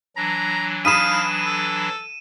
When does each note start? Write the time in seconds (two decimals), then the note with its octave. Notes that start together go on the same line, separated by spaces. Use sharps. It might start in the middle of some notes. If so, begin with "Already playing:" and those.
0.16 E3 F#3 D4 A#5
0.85 F5 B5 D#6 B6 D#7 E7
1.45 A4